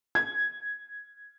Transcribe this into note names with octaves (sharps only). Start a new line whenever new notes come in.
G#6